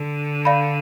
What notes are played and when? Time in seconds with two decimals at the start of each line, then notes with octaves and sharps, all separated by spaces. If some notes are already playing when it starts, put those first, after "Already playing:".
Already playing: D3
0.45 D5 F5 B5